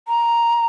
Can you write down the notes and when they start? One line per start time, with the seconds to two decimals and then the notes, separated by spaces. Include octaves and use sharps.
0.08 A#5